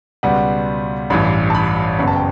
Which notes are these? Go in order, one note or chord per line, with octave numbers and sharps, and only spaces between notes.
C#2 B2 G3 B3 F#5
A1 G2 E3 B5
A5
B5
F#1 F#2 C#3 F#3 B3 B5
A5
G5